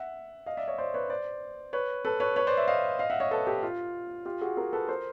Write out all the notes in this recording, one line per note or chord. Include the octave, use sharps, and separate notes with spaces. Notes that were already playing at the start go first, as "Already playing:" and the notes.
Already playing: E5 F#5
D#5 F5
D5 E5
C#5 D#5
C5 D5
B4 C#5
C5 D5
B4 C#5
A4 B4
B4 C#5
B4 C#5
C5 D5
D5 E5
D#5 F5
D#5 F5
E5 F#5
C#5 D#5
A4 B4
G4 A4
F4
F4 G4
F#4 G#4
G#4 A#4
A4 B4
A#4 C5